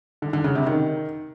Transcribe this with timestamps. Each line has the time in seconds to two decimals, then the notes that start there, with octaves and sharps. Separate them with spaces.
0.22 D3
0.33 D3
0.44 C#3
0.55 C3
0.66 D#3